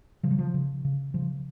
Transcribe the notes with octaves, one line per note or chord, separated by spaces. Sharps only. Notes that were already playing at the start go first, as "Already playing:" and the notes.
C#3 F3
F#3
F3
C#3
C#3
C#3 F3